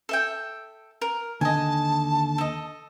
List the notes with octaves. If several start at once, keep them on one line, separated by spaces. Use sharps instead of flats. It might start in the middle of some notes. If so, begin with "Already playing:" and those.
A4 E5 G5
A#4
D#2 D3 D#5 G#5 A5
A4 D#5